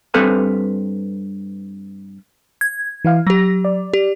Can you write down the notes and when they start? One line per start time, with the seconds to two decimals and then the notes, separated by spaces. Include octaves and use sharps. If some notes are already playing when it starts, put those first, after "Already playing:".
0.14 G2 C4 A4 B4 F5 G#5
2.61 G#6
3.05 E3 E4 F5
3.27 F#3 G4 A#6
3.65 D5
3.94 G4